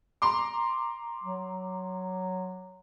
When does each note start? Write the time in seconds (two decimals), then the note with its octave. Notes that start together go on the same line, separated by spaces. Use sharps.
0.22 A#5 C6 D6
1.23 F#3